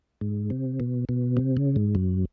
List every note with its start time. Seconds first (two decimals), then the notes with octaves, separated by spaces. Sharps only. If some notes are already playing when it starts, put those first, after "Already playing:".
0.21 G#2
0.50 C3
0.80 B2
1.09 B2
1.37 C3
1.57 C#3
1.76 G#2
1.95 F#2